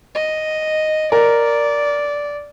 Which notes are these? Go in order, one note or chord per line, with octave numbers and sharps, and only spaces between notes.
D#5
A#4 D5